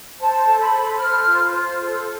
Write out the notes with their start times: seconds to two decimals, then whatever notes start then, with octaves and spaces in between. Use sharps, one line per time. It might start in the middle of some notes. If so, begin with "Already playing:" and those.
0.19 C5 A5
0.46 A4
0.59 B5
0.73 A4
0.99 C5 F6
1.25 F4
1.53 C5
1.80 A4